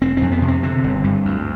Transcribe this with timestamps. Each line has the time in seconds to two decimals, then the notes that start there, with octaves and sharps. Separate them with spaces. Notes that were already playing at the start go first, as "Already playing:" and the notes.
0.01 F1 C4
0.17 F2 C4
0.32 B3
0.42 C3
0.48 C4
0.63 D3 C4
0.84 G1
1.04 G2
1.25 D2